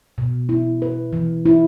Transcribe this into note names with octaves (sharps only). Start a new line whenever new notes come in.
B2
E4
B4
E3
E4